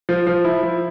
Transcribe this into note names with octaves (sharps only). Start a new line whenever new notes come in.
F3
F3
E4
F3